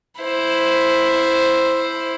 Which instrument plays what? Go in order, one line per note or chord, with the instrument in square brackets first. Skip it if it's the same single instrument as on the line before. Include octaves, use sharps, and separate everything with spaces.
[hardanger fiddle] E4 C5